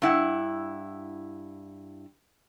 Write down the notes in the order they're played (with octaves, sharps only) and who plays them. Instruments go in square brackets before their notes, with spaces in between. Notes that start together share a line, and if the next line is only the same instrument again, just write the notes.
[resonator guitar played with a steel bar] G2 E4 F#5